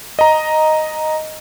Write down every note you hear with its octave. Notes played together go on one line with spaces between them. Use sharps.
D#5 A#5